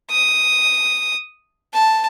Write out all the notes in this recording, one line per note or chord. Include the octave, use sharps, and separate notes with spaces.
D#6
A5